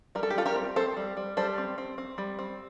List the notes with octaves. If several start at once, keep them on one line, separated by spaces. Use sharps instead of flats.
G3 A#4
A4
G4
G3 F4 A4
G4 A#4
C4
C4 A4 C5
G3
G3
G3 A4 C5
C4
C4
C4
G3
C4